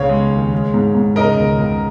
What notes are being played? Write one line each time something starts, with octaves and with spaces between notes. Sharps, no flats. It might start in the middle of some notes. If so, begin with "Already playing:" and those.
Already playing: C#2 C#3 C#5 F5
G#3
D#2
G#3
G#2
G#2
C#3 A#4 D#5
C#2
C#2